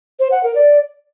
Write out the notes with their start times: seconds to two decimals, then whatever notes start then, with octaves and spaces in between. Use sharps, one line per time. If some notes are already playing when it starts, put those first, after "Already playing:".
0.19 C5
0.31 F#5
0.43 A#4
0.55 D5